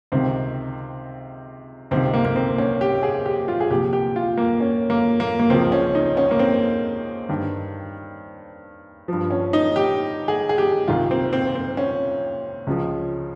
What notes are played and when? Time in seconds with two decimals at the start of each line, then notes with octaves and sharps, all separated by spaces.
0.12 C#2 C3 D#3 C4
1.91 C#2 C3 D#3 C4
2.14 A#3
2.25 A#3
2.36 C4
2.58 C#4
2.81 G4
3.03 G#4
3.26 G4
3.48 F4
3.60 G#4
3.70 C2 A#2 F3 G4
3.93 G4
4.16 F4
4.38 A#3
4.60 C#4
4.90 A#3
5.20 A#3
5.40 A#3
5.50 C#2 C#3 F3 C4
5.72 C#4
5.95 D#4
6.17 C#4
6.31 A#3
6.39 C4
7.29 G2 D#3
9.08 G2 F3
9.31 C#4
9.53 D#4
9.76 G4
10.28 G#4
10.49 G#4
10.58 G4
10.88 C2 C3 D#3 F4
11.11 C4
11.33 C4
11.55 C4
11.77 C#4
12.67 C#2 C#3 F3